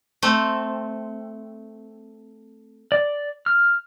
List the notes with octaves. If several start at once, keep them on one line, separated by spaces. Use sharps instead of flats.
A3 C4
D5
F6